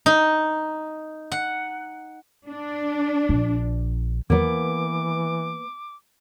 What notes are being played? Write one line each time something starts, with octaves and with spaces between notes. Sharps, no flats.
D#4
F#5
D4
A#1
E2 D#3 E3 F#3 A#3 B3 D6